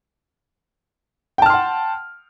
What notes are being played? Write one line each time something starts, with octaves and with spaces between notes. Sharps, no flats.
F#5 G5 A5 C6 F6